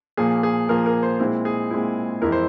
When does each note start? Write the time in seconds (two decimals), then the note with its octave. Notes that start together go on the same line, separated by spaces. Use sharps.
0.17 A#2 F3 A#3 G#4
0.43 G#4
0.69 A#2 F3 A#3 A#4
0.86 A#4
1.03 C5
1.20 A#2 G#3 C4 E4
1.45 G#4
1.70 A#2 G#3 C4 E4
2.22 F2 E3 G#3 E4 A#4
2.32 C5